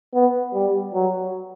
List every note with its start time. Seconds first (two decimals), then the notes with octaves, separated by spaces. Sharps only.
0.14 B3
0.53 G3
0.94 F#3